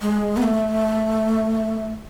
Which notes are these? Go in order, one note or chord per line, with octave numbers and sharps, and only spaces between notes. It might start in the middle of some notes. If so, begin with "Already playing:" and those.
G#3
B3
A3